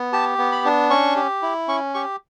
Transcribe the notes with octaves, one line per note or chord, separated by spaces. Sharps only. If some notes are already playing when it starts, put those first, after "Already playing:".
Already playing: B3
G4 A5
B3
B5
D4
C#4 C#6
G4
E4
C#4 C#6
G4 C#6